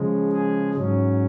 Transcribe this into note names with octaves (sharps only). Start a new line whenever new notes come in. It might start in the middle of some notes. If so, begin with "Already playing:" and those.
Already playing: C#3 F3 G#3
G#4
G#2 F#3 C#4